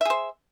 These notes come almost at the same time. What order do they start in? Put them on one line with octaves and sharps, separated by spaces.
E5 G#4 C5